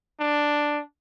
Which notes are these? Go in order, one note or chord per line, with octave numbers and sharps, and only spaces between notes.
D4